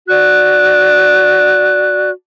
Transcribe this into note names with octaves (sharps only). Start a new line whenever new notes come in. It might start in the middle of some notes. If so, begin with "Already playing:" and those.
F#4 D5 F#6